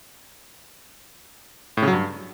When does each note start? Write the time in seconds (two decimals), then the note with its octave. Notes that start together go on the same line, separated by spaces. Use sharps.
1.77 A2
1.82 C#3
1.88 F#3
1.93 G2